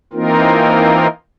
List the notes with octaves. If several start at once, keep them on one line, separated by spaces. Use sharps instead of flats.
E3 A#3 C4 D#4 F4 A#4